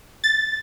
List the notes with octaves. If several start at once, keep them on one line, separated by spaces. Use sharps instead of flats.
A6